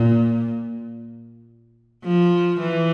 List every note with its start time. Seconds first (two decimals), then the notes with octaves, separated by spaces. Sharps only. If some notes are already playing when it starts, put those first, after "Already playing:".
Already playing: A#2
2.04 F3
2.60 E3